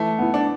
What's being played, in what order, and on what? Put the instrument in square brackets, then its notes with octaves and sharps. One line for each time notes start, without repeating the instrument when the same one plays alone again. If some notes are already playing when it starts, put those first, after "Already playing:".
Already playing: [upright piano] E3 [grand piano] A3
[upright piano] B3 E4
[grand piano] D4